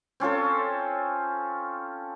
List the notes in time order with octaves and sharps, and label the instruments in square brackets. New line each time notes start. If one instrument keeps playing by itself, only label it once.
[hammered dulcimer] C4 C#4 F4 A4